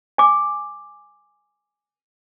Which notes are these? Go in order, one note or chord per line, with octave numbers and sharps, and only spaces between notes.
G#5 D6